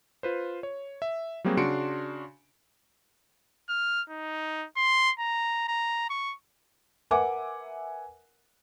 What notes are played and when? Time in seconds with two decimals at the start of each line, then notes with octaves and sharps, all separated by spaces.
0.23 F4 B4 C5
0.63 C#5
1.02 E5
1.44 F#3 G3 A#3 C4 F#4 G#4
1.57 C#3 D4 F#4 C6 C#7 D7
3.69 F6
4.10 D#4
4.77 C6
5.19 A#5
5.68 A#5
6.10 C#6
7.11 A#4 B4 E5 F#5 G#5 D6